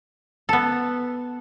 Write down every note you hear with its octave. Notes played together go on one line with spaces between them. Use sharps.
B3 A4